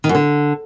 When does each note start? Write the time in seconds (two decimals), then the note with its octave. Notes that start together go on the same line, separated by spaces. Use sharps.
0.04 D#3
0.09 F#2
0.15 D3